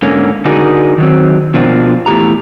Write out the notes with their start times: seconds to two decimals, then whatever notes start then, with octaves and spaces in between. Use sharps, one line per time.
0.02 G#2 D3 A#3 C#4
0.45 D3 D#4 F#4 G#4 A#4 D5
0.98 D#3 F#3 C4
1.54 B2 F3 A#3 C4 D4 F4
2.06 E2 A2 G4 A#5